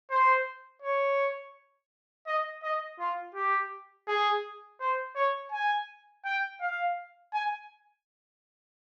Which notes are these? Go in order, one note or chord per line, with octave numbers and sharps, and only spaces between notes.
C5
C#5
D#5
D#5
F4
G4
G#4
C5
C#5
G#5
G5
F5
G#5